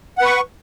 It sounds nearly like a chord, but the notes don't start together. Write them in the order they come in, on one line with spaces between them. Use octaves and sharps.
F#5 B4 C#6